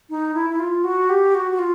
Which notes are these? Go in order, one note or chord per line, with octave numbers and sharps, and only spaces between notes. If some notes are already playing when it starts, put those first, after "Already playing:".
D#4
E4
E4
F4
F#4
G4
F#4
F#4
F4